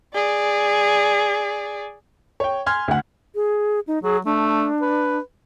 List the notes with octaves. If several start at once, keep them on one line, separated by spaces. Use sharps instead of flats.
G#4 D5
C#5 G5
G#5 C6 F6 G#6
D2 F#5
G#4
D#4
F#3 G#4
A3 D4
B4